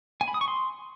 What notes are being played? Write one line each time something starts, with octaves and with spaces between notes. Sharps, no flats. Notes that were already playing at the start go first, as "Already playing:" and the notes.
G#5
B5
D#6
C#6
C6